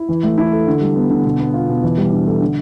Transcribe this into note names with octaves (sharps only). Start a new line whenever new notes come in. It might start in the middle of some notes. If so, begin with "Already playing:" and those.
Already playing: E4
E3
A3
E4
A4
D3
G3
B3
D3
B2
B3
F4
B2
E3
G3
D4
A4
D3